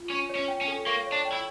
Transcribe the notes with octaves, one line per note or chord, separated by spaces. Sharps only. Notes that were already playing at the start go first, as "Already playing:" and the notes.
Already playing: F4
C#4 C#6
C#5
C#4
G5
C#4
A4
A#3 C#6
C#5
D4
G5
E4